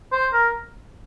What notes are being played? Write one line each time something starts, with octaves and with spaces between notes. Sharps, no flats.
C5
A#4